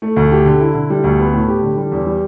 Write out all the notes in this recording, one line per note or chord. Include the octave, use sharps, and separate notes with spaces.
A3
D2
G4
D3
E4
D3
G3
D2
B3
A2
G4
D3
G3
E2
G3